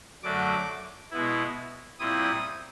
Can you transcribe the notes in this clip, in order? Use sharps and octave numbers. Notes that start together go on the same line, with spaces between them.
F#2 D3 F#3 A3 D6
B2 G#3 B3 E4
A#2 G3 C4 E4 D#6